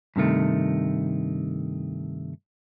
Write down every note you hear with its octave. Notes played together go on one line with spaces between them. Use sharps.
G2 C3 D#3 A3